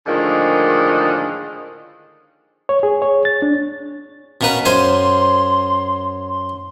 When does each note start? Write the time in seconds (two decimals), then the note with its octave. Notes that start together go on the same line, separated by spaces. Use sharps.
0.06 A2 D3 D#3 F3 G#3 A#3
2.69 C#5
2.83 G#4
3.02 C#5
3.25 A6
3.42 D4
4.41 B2 A#3 C#4 B4
4.65 F#2 C5 G#5 C6
6.28 C6